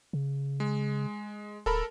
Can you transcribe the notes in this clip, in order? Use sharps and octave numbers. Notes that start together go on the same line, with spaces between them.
C#3
G#3
D1 A4 A#4 B5